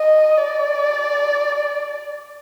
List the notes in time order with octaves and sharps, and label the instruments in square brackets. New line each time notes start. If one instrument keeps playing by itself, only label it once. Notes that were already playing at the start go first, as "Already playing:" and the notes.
Already playing: [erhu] D#5
D5